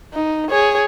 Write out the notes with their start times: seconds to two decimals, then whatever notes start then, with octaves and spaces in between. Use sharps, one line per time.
0.14 D#4
0.50 G#4 C#5